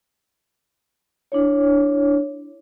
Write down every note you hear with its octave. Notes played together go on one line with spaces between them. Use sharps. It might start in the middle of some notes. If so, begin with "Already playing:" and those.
D4 E4 C#5